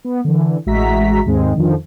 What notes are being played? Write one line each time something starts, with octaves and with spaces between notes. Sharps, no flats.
B3
D3 E3
A1 G#3 F#4 E5 A#5 B6
D#2 G#2 G#3 C4
F2 D3 D#3 F3